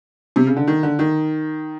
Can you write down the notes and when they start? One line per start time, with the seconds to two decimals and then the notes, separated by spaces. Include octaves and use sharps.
0.36 C3
0.47 C#3
0.56 D3
0.67 D#3
0.83 D3
0.99 D#3